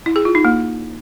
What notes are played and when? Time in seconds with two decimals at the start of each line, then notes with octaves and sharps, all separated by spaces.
0.06 E4
0.16 G#4
0.25 F4
0.35 D#4
0.45 A#3